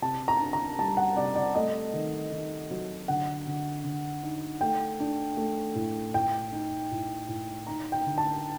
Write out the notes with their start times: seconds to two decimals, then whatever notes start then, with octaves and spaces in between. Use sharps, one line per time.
0.02 C3 A5
0.28 A#5
0.40 D4
0.53 A#5
0.78 G3 A5
0.97 F#5
1.16 C3 D5
1.36 D5
1.55 A3 D#5
1.93 D#3
2.31 D#3
2.70 F#3
3.08 D3 F#5
3.47 D3
3.84 D3
4.23 D#4
4.61 A3 G5
5.00 D4
5.37 A3
5.75 A2
6.14 A2 G5
6.52 D#4
6.91 A2
7.28 A2
7.67 D#4 A#5
7.92 G5
8.06 D3
8.18 A5